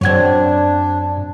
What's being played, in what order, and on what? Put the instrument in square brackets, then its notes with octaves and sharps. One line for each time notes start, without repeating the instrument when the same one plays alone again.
[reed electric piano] F#2 G#6 [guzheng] C4 F#4 C#5 [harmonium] D4